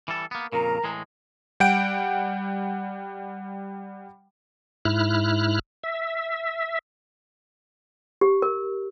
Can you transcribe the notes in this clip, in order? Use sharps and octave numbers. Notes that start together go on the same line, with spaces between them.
E3 G3 A4
A#3 B3
F2 A#2 C#3 A#4 A#5
A2 E3 G#3
G3 F#5 G5 G6 D7
G#2 E4 F6 F#6
E5
G4
A#4